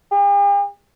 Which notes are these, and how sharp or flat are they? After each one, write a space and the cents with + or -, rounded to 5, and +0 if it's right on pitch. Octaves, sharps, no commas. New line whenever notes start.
G4 +45